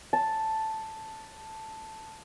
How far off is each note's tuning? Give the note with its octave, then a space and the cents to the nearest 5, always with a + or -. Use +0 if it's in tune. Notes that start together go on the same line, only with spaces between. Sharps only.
A5 +0